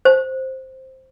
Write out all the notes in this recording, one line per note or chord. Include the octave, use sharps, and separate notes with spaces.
C5